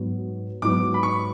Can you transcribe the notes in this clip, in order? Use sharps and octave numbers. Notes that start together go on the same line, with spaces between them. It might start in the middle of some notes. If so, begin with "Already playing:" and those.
Already playing: G#2 F#3 B3
G#2 F#3 B3 D6
B5
C#6